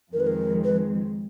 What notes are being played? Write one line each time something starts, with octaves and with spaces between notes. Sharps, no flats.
F2 D#3 G#3 A#4
B4
A#4
B4